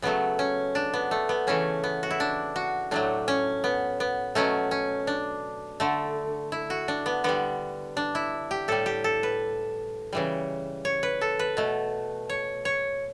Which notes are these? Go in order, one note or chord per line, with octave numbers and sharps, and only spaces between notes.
C#3 F#3 A3 B3
C#4
D4
B3
A3
B3
C#3 E3 A3 C#4
B3
F#4
E4
D4
F#4
A2 F#3 A3 D4
C#4
B3
B3
B2 F#3 A3 C#4
C#4
D4
D3 A3
E4
F#4
D4
B3
D3 G3 B3
D4
E4
G4
A2 G3 A4
G4
A4
B4
C#3 E3 G3
C#5
B4
A4
B4
B2 A3
C#5
C#5